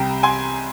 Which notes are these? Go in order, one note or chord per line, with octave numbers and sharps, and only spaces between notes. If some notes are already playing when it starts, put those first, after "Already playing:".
Already playing: C2 C3 G3 G5 A#5
G#5 C6